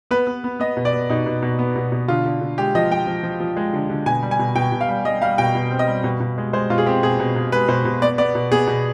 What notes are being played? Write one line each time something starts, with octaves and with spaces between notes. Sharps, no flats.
B3 B4
B3
B3
B3 D#5
B2
D5
B3
B2 D#4
B2
B2
B3
B2
B2
D3 F4
D3
D3
G#3 G4
F3 D#5
F3 G5
F3
F3
F3
G#3
D3
D3
B2 G#5
G3
G#5
B2
B2 G5
B2
F5
G3
G3 D#5
G3 F5
B2 G5
B2
C4
D#5
G3
B2
B2
G#3
G#3 C5
B2 F4
G#4
C4 G4
B2 G#4
B2
B2
G#3 B4
B2 C5
B2
B3 D5
B3 D5
B2
B3 G#4
B2